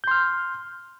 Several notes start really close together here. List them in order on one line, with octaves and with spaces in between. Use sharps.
G6 C6 F6